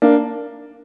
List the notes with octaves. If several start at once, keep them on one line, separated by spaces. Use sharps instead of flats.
A#3 D4